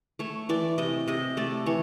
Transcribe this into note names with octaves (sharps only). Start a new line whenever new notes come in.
A3 C#5
E3 D5
C3 D#5
C3 D#5
A3 D5
E3 C#5